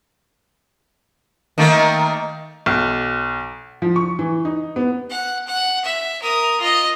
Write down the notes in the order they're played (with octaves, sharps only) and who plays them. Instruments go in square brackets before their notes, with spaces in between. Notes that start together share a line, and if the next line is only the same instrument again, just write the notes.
[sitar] D#3 A3 A#3
[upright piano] B1
[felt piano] F3
C#6
E3
D#4
B3
[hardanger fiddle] F#5
F#5
E5
A#4 D#6
F4 D#5